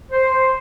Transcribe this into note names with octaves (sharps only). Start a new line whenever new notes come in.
C5